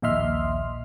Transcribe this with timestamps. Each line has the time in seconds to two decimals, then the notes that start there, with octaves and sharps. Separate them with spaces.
0.02 A#1 D#2 D#5 E5 C6 F6